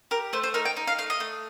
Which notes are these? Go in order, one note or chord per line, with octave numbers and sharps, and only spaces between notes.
G4 A#4
A3 C5
C5
D#4 A#4
G5
D#4
F5
A3 F5
D#5
A3